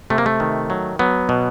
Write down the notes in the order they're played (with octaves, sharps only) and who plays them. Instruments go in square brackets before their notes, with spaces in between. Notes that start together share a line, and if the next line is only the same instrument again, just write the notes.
[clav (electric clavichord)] C3 A3
A#3
A3
D#3
F#3
F#3 B3
B2